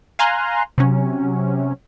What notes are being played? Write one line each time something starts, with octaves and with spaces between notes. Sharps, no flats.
F5 G#5 A#5 C6 F#6
C3 F#3 C#4